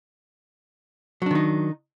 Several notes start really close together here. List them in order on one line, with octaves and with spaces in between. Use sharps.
F#3 D4 D#3 D#4